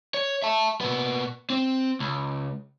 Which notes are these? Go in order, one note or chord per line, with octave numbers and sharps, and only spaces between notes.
C#5
E5 A5
A#2 B3
C4
C#2